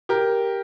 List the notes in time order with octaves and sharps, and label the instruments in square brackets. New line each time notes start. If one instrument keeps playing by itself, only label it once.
[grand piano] G4 A#4